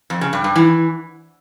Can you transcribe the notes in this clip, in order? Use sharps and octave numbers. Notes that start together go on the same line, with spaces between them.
F2
C#3
G2
G2
E3